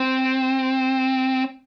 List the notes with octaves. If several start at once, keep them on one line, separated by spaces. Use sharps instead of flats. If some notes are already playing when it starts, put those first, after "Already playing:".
Already playing: C4